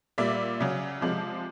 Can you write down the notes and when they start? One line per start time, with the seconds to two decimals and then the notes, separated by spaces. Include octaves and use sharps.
0.18 A#2 G3 D5 E5
0.60 C#3 F#3
1.01 C3 F3 G#3